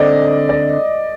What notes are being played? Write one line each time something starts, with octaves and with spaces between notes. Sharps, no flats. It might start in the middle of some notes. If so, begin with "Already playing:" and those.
Already playing: D3 C4 D#4 D5 D#5
D5